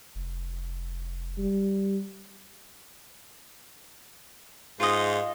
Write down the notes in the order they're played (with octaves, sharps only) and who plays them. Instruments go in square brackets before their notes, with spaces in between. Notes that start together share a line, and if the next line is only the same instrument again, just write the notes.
[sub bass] F1
[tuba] G3
[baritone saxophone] G#2 [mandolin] F4 D#5